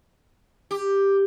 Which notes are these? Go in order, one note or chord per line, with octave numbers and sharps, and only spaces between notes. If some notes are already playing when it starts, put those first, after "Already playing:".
G4